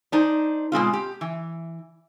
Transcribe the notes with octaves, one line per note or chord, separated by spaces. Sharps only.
D4 D#4 C5
B2 G#3 C4 F4
G4
E3